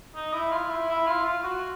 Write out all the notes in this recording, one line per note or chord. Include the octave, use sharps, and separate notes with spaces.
D#4
E4
F4
E4
E4
F4
F4
F#4